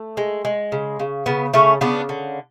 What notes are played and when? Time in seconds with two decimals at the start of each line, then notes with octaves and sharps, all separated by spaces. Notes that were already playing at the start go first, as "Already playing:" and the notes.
Already playing: A3
0.17 G#3
0.45 G#3
0.72 C#3
1.00 C#3
1.26 C#3 B3
1.54 C#3 A3 C#4
1.81 C#3 B3 D4
2.09 D3